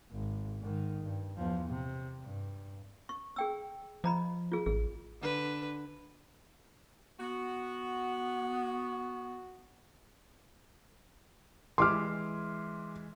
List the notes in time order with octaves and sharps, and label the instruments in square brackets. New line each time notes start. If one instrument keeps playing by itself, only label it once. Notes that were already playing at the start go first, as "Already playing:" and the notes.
[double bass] G#1
G#2 D#3
G2
E2 F3
C3
G2
[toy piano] C#6
G#4 G5 E6
[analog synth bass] F3 [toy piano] D#5 A#5 B5
[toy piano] F4 G#4
[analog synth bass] A1 [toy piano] G#4
[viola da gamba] D3 B4
[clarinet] B3 [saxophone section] F#4
[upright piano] E3 G#3 E5 [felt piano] C6 D6 F6